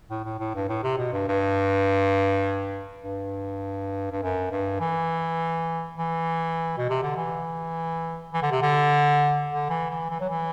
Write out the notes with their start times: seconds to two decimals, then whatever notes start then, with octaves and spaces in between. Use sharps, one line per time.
0.10 A2
0.24 A2
0.39 A2
0.55 G2
0.69 A2
0.83 C3
0.98 B2
1.13 G2
1.28 G2
3.04 G2
4.11 G2
4.22 F#2
4.51 G2
4.80 E3
5.98 E3
6.77 B2
6.89 C3
7.03 D3
7.16 E3
8.33 E3
8.42 D3
8.52 C3
8.62 D3
9.51 D3
9.70 E3
9.90 E3
10.10 E3
10.20 F#3
10.29 E3